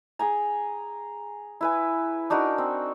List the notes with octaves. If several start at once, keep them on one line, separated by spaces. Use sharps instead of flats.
G#4 G5 G#5 A#5
E4 B4 G#5
D4 D#4 F#4 A#4
C4